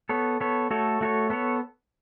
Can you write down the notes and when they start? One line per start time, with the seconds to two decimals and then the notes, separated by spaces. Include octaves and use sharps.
0.09 B3 A4 C#5
0.40 B3 A4 C#5
0.71 A3 F#4 A4 C#5
1.01 A3 F#4 A4 C#5
1.30 B3 A4 C#5